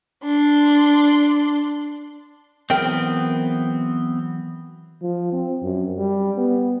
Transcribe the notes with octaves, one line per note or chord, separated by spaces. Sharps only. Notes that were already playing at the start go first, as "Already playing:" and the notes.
D4 C6
E3 F#3 B3 C4 G#4 A#4 E5 G5
F3
C4
F#2
G3
B3